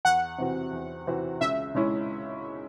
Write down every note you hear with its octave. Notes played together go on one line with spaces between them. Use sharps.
E2 F#5
C3 E3 C4 F#4
E2
C3 E3 C4 F#4
C#2 E5
C#3 G#3 C#4 E4